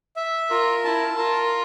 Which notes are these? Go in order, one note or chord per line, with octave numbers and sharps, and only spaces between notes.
E5
F4 A#4
E4 A5
F4 A#4